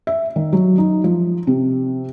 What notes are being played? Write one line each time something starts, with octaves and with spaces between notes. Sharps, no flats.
E5
D#3
F#3
D#4
F3
C3